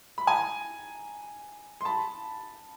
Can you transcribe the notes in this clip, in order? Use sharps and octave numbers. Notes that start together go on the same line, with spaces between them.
B5
G#5 A#5
C6
A5 B5